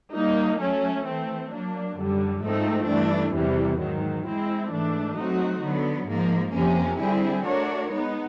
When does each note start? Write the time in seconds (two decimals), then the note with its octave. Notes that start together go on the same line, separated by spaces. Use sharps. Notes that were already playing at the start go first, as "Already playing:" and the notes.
0.13 G3 A#3 D#4
0.59 F#3 A3 C#4
1.05 E3 A3 C4
1.51 F#3 A#3 D4
1.97 F#2 D3 G3
2.42 G#2 F3 A3 C4 D#4
2.88 G2 E3 A3 D4
3.34 E2 C3 E3 G3
3.80 G#2 D#3 F#3
4.25 G#3 C4 E4
4.71 G#2 E3 A3 D4
5.17 F#3 A3 C4 D#4 F#4
5.63 D3 F#3 B3
6.08 G#2 F3 A#3
6.54 F2 C3 F3 A#3 C#4
7.00 D3 G3 C4 E4 G#4
7.45 A3 D4 F#4 A#4 C#5
7.92 G#3 B3 D#4